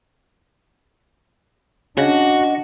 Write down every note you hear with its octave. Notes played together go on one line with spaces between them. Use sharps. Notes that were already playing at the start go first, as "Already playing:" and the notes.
C#3 D4 F#4 D#5 F#5